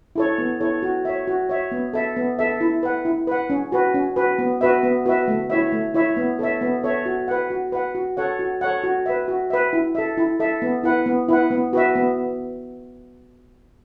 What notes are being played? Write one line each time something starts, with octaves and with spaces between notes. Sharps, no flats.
E4 A4 C#5
B3
E4 A4 C#5
F#4
C#5 E5
F#4
C#5 E5
B3
A4 E5
B3
A4 E5
E4
B4 F#5
E4
B4 F#5
C#4
F#4 B4
C#4
F#4 B4
B3
F#4 B4 E5
B3
F#4 B4 E5
A3
E4 C#5 E5
A3
E4 C#5 E5
B3
A4 C#5 E5
B3
A4 C#5 E5
F#4
B4 F#5
F#4
B4 F#5
F#4
A4 C#5 F#5
F#4
A4 C#5 F#5
F#4
B4 E5
F#4
B4 E5
E4
A4 E5
E4
A4 E5
B3
E4 B4 F#5
B3
E4 B4 F#5
B3
F#4 B4 E5
B3